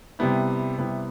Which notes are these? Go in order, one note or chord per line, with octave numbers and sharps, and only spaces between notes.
C3 G3 B3 E4
C3 G3 B3 E4